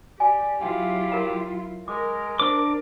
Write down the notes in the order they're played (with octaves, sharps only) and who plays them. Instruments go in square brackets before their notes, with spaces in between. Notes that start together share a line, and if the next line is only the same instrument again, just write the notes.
[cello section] G4 [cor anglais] D5 [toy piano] G#5
[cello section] F#3 E4 F4 [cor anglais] G4
[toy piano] A#4 A#5
[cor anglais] G#3 [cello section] A#4 [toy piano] D6
[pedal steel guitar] D4 D6 [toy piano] C5